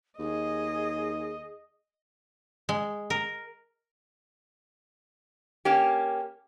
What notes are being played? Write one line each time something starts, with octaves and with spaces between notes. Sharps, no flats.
D#2 G#4 D#5
G#3
A#4
A#3 C#4 G4